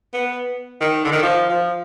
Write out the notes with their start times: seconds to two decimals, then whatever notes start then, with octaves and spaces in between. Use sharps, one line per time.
0.14 B3
0.81 D#3
1.04 D3
1.12 D#3
1.22 F3
1.49 F3